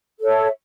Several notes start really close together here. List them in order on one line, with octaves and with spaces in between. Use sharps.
A4 C#5 E5